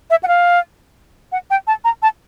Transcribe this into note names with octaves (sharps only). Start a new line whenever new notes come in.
E5
F#5
F5
F#5
G5
A5
A#5
A5